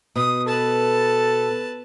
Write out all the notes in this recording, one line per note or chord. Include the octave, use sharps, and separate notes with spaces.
B2 D#6
A4 B4 A5